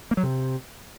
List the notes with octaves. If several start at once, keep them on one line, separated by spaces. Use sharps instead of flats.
A#3
F#3
C3